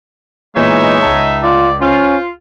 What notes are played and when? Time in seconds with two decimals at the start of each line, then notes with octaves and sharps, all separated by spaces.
0.56 A#2 E3 G#3 B3 D#4 C#5 E5
1.03 C#2 A5
1.43 F4 D5
1.81 C#4 F4 C5